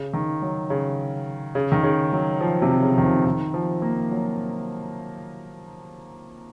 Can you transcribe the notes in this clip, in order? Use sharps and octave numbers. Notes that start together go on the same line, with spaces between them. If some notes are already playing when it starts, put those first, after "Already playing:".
Already playing: C#3
D#3
F#3
C#3
C#3
D#3
C#3
F#3
F3
C3
C#3
D#3
F3
D#3
F3
A#3
F#3